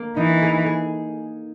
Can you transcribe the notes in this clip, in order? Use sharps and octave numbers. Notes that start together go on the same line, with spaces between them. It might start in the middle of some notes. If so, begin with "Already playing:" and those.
Already playing: A#3
E3 D#4
G#4
G#4